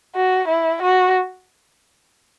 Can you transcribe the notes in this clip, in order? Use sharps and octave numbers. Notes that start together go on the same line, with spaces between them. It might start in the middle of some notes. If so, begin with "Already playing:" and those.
F#4
E4
F#4